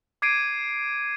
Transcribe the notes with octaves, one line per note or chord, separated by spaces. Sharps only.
D6 G#6 C7 D7 D#7